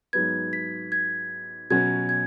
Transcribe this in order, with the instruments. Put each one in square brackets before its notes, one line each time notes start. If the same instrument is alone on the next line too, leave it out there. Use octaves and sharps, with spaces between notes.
[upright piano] G#2 F#3 B3 [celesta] G#6
[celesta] B6
G#6
[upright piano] B2 F#3 C#4 F#4 [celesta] G#6
[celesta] G#6